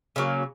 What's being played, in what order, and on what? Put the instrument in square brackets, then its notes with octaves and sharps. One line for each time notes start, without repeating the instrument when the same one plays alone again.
[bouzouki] C#3 F#3 A#3